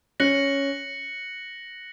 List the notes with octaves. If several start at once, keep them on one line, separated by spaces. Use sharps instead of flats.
C#4 F#6 A#6 C#7 F#7